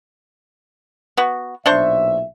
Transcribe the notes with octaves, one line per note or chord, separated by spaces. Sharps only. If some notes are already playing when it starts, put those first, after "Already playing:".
B3 F#4
B1 A#2 D4 C5 E5 C#6